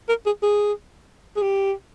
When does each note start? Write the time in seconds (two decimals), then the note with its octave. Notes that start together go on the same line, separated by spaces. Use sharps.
0.09 A#4
0.26 G#4
0.43 G#4
1.36 G#4
1.42 G4